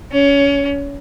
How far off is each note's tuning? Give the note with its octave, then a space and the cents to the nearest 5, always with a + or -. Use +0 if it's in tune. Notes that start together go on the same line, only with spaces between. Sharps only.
C#4 +25